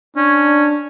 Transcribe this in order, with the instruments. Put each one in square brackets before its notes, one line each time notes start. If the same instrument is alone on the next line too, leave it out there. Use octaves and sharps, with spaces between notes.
[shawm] C#4 [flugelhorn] D4